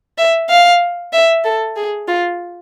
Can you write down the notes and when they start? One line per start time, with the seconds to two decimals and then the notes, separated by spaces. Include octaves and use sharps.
0.18 E5
0.49 F5
1.13 E5
1.45 A4
1.76 G#4
2.08 F4